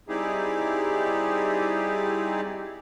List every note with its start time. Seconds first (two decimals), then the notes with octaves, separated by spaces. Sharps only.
0.09 G3 C4 D#4 E4 G4 G#4